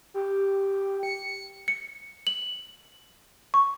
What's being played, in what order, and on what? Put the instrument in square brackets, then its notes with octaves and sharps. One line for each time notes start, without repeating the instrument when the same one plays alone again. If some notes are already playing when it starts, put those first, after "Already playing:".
[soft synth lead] G4
C#7
[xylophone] C#7
F#7
C#6